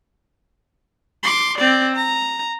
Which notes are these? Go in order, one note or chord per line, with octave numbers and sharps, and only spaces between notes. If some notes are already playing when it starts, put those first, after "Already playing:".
C6 D6
C4 D5
A#5